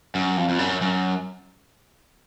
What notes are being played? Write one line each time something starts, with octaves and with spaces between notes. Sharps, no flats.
F#2
F2
F2
F#2
F#2